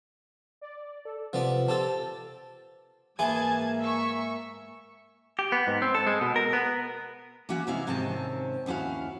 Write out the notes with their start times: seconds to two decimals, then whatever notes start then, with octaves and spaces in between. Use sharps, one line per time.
0.61 D5
1.05 A4
1.33 C3 F3 B3 D5
1.68 C4 G4 A4 A5
3.19 G#2 E3 A#3 G#4 G#5 A5 D6 G#6
3.80 E5 C#6
5.39 G4
5.52 B3
5.67 G#2
5.82 C4
5.95 A4
6.07 G#3
6.21 B2
6.36 A#4
6.53 B3
7.49 E3 A#3 C#4 F#4
7.67 C3 E3 G#3 E4 E5 F5
7.87 G#2 C3 D#3 C4 C#4 A5
8.66 D#2 C#4 E4 F#4 F5